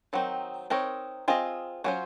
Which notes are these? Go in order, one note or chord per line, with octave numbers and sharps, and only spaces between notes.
D#3 F#3 C4 D#4
C4 D#4 A#4 C#5
C4 F4 G#4 D#5
F#3 A#3 C#4 F4 C5